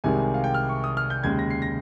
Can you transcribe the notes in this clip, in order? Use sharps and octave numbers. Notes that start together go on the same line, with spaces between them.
C2 C3 D#3 G#3 G#5
G#5
F5
G5
F6
C#6
D#6
F6
G6
D#2 C#3 G#3 G#6
A#6
C7
A#6